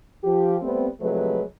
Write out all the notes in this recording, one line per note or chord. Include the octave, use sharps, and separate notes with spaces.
F3 G4
G3 A3 B3 C4
C3 F3 F#3 G#3 A3 B4